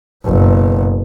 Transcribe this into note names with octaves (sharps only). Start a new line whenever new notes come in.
F#1 B2